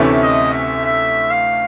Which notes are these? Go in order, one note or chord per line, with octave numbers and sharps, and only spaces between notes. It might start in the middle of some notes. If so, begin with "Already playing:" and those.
Already playing: D2 C3 E3 A3 C#4
D#5
E5
E5
F5